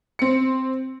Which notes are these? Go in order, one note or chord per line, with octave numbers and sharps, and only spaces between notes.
C4 C#7